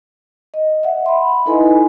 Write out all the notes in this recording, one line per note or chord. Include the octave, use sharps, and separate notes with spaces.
D#5
E5 F#5
B5 C6
D#4 E4 A4 B4 D#5 G#5